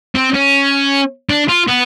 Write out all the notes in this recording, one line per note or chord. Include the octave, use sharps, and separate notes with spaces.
C4
C#4
D4
F4
B3